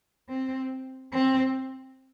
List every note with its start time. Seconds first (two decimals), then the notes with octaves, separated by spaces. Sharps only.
0.29 C4
1.12 C4